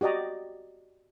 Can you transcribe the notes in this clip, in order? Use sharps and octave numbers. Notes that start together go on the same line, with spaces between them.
F#4 G4 D5 D#5 A#5